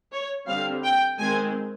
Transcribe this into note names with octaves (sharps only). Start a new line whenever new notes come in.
C#5
D3 G3 C4 F5
G5
D#3 G#3 C4 G#5